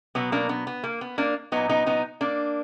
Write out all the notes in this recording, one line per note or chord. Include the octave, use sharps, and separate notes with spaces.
B2 F#3 B3
A#3 D4
B3
B3
A#3
B3
A#3 D4
A#2 F#3 B3 D#4
B3 D#4
B3 D#4
A#3 D4